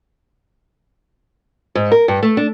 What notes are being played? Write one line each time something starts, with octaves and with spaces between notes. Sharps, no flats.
G#2
A#4
G2
A3
D4